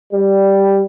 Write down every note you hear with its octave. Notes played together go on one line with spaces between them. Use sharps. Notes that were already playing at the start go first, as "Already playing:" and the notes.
G3